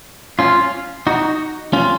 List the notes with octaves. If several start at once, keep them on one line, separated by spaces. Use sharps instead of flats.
C#4 F4
D#4 F#4
C#4 F4